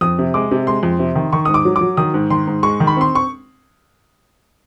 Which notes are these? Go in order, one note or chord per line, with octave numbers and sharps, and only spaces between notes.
F2 D#6
C3
G#3 D6
C3
G#3 C6
F2
C3
D#3
D#3 C#6
G#2 D#6
D6
F#3
D6
F#3
D#3 D#6
G#2
D#3 C6
G#2
G#3 C#6
D#3
B5
C4 C6
C#6